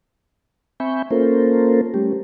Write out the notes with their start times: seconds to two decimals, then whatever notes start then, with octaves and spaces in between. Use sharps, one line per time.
0.80 C4 E5 G#5 B5 C#6 G6
1.11 A#3 C#4 F4 A4 A#4 C5
1.94 G3 A3 C#4 G4